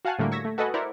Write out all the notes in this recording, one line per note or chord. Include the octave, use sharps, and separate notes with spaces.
F#4 F5 F#5 G#5 A5 F#6
A2 D3 G3 A3 A#3
C#6 E6 G#6 A#6 B6
A3
F#4 A4 B4 D#5 F#5 G#5
E4 A#4 C5 D5 F#5